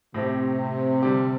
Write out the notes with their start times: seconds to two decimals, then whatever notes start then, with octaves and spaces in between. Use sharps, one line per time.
0.14 A2 C3 A3 C4 G4
1.03 D3 G3 C4 G4